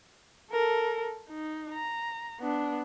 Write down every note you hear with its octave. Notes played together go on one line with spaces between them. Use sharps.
A4 A#4
D#4
A#5
B3 D4